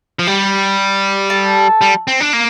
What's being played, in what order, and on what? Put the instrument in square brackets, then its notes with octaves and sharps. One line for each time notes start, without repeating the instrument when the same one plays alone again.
[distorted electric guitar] F3
[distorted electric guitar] G3 [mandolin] G4
[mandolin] A4
[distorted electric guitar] G3
C4
D4
A#3